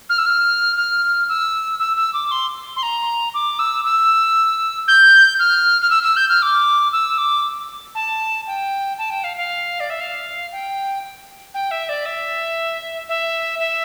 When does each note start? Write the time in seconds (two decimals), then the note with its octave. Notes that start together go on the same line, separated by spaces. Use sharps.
0.10 F6
0.18 E6
0.26 F6
0.77 F6
1.29 E6
1.79 E6
1.97 E6
2.14 D6
2.31 C6
2.76 C6
2.83 A#5
3.34 D6
3.59 E6
3.85 E6
4.88 G6
5.39 F6
5.82 F6
5.90 E6
6.03 E6
6.17 G6
6.29 F6
6.42 D6
6.93 E6
7.18 D6
7.95 A5
8.47 G5
8.98 A5
9.10 G5
9.24 F5
9.37 F5
9.80 D5
9.90 E5
10.01 F5
10.52 G5
11.54 G5
11.71 E5
11.89 D5
12.06 E5
13.09 E5
13.60 E5